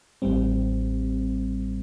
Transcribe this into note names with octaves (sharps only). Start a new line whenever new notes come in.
A1 A2 G3 C4